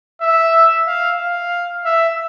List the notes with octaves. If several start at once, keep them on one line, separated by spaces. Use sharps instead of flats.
E5
F5
F5
E5